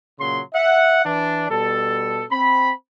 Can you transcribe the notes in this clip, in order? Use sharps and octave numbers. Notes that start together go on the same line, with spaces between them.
A#2 C#3 F#3 C6
E5 F#5
E3 D4
B2 G3 A4
C4 B5